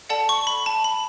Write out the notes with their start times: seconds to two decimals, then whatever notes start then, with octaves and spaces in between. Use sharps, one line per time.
0.09 A4 D5 F#5 A5
0.29 C#6
0.47 B5
0.66 A5
0.84 B5